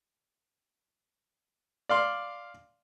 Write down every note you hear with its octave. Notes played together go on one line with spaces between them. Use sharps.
D5 F5 C6